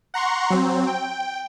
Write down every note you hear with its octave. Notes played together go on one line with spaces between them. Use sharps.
F#5 A#5 C6 C#6
F#3 C4
G5